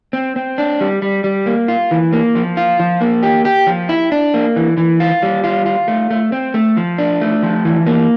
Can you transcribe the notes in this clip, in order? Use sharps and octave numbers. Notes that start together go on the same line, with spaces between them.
C4
C4
D4
G3
G3
G3
A#3
F4
E3
A#3
F3
F4
F3
A#3
G4
G4
F3
E4
D4
A#3
E3
E3
F4
G3
F4
F4
A3
A3
C4
A3
F3
D4
A3
F3
E3
A#3